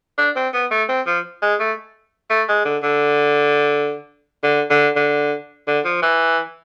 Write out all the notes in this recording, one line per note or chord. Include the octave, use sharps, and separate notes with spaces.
D4
C4
B3
A3
C4
F3
G#3
A3
A3
G#3
D3
D3
D3
D3
D3
D3
F3
E3